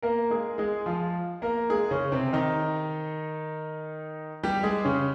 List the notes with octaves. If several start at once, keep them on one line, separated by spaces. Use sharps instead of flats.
A#3 A#4
G#3 G#4
G#3 G#4
F3 F4
A#3 A#4
G#3 G#4
C#3 C#4
C3 C4
D#3 D#4
G3 G4
G#3 G#4
C#3 C#4